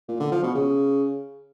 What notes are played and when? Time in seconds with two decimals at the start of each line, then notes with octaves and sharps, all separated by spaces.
0.08 A#2
0.20 D3
0.32 F3
0.43 B2
0.55 C#3